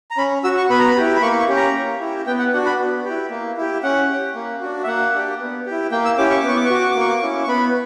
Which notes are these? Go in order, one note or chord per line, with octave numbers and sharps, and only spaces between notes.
A#5
C#4 B5
F#4 E6
C#6
B3 B5
A#5
B5
E4 G4
B5
A#3 C#6
C#6
C#4 G4
A#5
A#3
E4 G4
B3 G5
F#5
D4 F#4 F#5
B5
B3
E4 G4
A#3
E4 G4
C#4 F#5
G4
A#3
D4 F#4
E5
A#3 F#5
D4 G4
B3
E4 G4
A#3 G5
E6
C#4 E4 G4 D6
C#6
D6
B3 C#6
D6
C#6
F#4 D6
C#6
D6
A#3 C#6
D6
C#6
C#4 E4
C#6
B3 B5